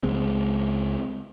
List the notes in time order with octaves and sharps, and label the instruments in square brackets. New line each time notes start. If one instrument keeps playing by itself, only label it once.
[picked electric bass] C#2 G#3 C4